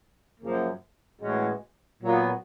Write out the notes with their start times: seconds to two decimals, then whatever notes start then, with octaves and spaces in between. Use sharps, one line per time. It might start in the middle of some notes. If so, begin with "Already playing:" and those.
0.40 F#2 C#3 F3 A#3
1.21 A2 E3 G#3 C#4 F#4
2.02 A#2 F#3 B3